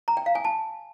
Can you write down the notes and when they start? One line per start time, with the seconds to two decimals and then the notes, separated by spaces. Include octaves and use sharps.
0.08 A#5
0.17 G5
0.26 F5
0.35 G#5
0.44 A5